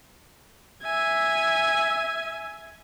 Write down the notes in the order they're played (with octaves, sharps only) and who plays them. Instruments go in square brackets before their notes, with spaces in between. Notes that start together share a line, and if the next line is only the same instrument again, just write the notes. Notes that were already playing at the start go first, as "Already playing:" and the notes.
[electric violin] E5 G#5